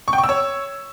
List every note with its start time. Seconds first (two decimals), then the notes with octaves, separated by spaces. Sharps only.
0.08 C#6
0.13 G5
0.18 C#6
0.24 E6
0.29 C#5